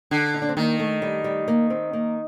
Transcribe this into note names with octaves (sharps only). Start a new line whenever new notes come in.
D3
D#4
D4
C4
D#3 A#3
A3
G3
G3
A#3
C4
A#3